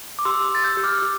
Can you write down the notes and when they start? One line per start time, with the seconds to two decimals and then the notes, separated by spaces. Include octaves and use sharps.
0.19 D6
0.25 G4 C6 E6
0.52 G4 A6
0.64 E6 G6
0.77 G4
0.84 D6 F6
1.02 G4